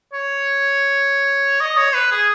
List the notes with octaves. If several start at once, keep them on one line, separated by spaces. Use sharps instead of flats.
C#5
D#5
C#5
B4
G#4